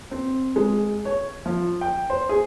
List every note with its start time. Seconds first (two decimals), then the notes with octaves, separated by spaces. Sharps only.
0.11 C4
0.56 G#3
1.05 C#5
1.46 F3
1.81 G5
2.10 C5
2.29 G#4